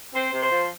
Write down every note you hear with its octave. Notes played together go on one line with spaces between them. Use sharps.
C4 C5
C3
C5
F3